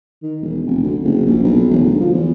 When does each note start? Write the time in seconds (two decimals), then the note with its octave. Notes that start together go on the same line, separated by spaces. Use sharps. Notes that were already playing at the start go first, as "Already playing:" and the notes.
0.23 D#3
0.41 E1
0.66 F1
0.83 D2
1.04 F#1
1.26 A#1
1.43 B1
1.71 E1
1.83 D2
2.01 F3
2.14 E2